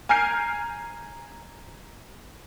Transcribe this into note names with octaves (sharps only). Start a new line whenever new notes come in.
G#5 A#5 F6 G6 C7 D7